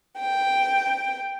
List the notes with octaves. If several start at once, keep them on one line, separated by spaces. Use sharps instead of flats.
G5